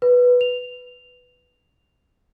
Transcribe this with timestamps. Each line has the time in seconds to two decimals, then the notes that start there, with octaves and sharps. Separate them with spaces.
0.02 B4
0.41 F7